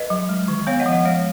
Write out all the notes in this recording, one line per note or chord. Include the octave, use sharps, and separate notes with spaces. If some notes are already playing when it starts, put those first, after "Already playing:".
Already playing: B4 D#5
F#3
G#3
D#3
B3 C#5 F5
D#5 F#5
F3
D#5 F#5
G#3 C#5 F5